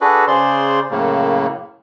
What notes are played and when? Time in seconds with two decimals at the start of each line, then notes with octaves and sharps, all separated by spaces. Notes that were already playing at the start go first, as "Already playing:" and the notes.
0.01 D4 F#4 G#4 A4 B4
0.27 C#3 G#4 C5 D5 C6
0.91 F#2 A2 C#3 A#3